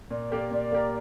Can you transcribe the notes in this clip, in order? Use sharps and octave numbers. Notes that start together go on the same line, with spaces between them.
A#2 D5
A#3 G4 A#4
A#2 D5
A#3 G4 A#4